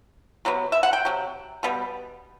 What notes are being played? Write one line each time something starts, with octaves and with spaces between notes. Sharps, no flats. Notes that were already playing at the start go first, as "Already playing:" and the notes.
C3 F#3 B3
E5
F#5
G5
C3 F#3
B2 G3 B3